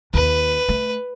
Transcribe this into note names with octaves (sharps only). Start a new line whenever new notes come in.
D#2 B4
A3